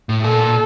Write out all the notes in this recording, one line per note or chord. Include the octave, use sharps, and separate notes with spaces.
A2
A#2 A4